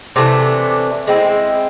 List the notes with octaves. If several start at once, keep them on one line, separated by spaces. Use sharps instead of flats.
C3 E3 A3 D4
G#3 C4 E4